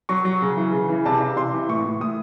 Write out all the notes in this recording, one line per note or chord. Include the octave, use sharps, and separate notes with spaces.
F#3 C#6
F#3
C#3
E3
C#3
E3
C3 A5
C3
C3 C6
E3
A2 C#6
A2
A2 D#6